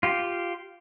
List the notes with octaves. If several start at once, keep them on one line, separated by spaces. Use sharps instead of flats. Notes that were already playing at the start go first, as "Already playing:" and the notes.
F4 G4